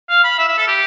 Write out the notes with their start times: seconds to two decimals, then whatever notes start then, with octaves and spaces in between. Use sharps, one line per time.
0.10 F5
0.24 B5
0.39 E5
0.49 E5
0.58 A4
0.68 G4